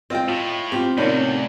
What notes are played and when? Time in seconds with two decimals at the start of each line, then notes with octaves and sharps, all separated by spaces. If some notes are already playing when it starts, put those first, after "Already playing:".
0.10 C4 F4 D#5 G5
0.28 A2 F4
0.72 C4 F4 G4
0.98 E2 A2 C3 A#3 C#4 D#4 D5